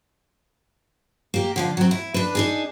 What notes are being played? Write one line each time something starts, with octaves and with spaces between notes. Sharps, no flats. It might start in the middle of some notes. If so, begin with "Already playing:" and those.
A#3 G4
D3 F3 F4
F#3 C4
E4
D4 B4
D4 D#4 G#4